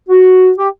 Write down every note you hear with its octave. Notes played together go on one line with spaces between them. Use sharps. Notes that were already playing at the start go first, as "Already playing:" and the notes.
F#4
G4